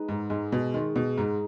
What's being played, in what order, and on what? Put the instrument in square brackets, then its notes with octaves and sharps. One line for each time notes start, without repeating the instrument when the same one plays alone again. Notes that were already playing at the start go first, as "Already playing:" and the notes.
Already playing: [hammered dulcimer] G#3 D#4 B4
[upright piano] G#2
[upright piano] G#2 [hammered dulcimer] G#3
[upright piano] B2
[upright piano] D#3 [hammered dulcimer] G#3
[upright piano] B2
[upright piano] G#2 [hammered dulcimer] D#4